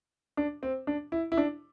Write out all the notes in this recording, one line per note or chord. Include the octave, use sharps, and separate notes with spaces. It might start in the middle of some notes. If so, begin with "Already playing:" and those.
D4
C4
D4
E4
E4
D4